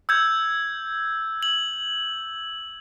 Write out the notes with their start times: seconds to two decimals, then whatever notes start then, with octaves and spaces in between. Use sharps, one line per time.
0.09 E6 G6 G#6
1.43 F#7